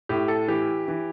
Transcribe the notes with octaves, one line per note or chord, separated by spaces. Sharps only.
A2 G4
A4
E3 G4
E3